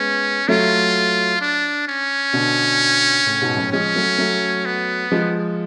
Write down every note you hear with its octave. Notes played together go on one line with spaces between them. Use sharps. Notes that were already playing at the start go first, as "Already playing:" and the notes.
Already playing: G#3 B3 C#4
F#3 A3 F4
D4
C#4
B2 D3
A2 C#3
G#2 B2
F#2 A2
F3 G#3 C#4
F#3 A3
F#3 A3
B3
F3 G#3